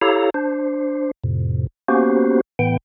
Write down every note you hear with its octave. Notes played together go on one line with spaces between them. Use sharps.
E4 G4 A4 C#5 F5 A#5
D4 C5
F2 A2 C3
A#3 B3 C#4 F#4 G4 C5
A2 E3 B3 G5